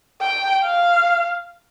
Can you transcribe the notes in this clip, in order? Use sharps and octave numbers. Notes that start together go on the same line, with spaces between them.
G5
F5